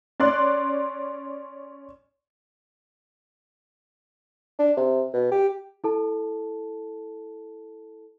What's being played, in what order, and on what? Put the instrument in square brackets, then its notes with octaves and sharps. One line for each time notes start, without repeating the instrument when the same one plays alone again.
[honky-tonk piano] C#4 D5 C6 F#6
[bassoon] D4
C3
B2
G4
[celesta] E4 A4 A5